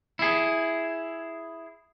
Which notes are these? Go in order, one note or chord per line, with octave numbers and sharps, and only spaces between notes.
E4 G#4